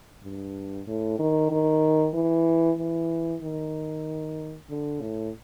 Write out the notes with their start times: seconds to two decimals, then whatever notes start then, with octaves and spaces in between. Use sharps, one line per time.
0.23 G2
0.87 A2
1.19 D#3
1.51 D#3
2.14 E3
2.79 E3
3.42 D#3
4.70 D3
5.01 A2